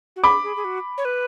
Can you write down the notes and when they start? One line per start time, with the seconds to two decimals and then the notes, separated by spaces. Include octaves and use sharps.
0.16 F#4
0.23 G#4 B5 D6
0.43 G#4
0.56 G#4
0.64 F#4
0.98 C#5
1.05 B4